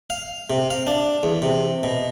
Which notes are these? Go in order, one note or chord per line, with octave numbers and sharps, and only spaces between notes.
F5
C3
F5
D4
E2
C3
B2